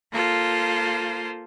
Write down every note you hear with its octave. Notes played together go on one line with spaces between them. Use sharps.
A#3 F4 A4 C5